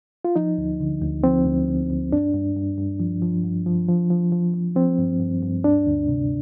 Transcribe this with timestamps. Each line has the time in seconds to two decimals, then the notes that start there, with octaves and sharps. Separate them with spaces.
0.25 F4
0.36 F3 D#4
0.58 D2
0.80 D3
1.02 D2
1.24 F3 C4
1.46 D2
1.68 D2
1.90 D2
2.12 G2 D4
2.34 G2
2.56 G2
2.78 G2
3.00 F3
3.22 F3
3.44 G2
3.66 F3
3.89 F3
4.10 F3
4.32 F3
4.54 F3
4.76 F3 C4
4.98 G2
5.20 G2
5.43 G2
5.64 D2 D4
5.86 D2
6.08 C3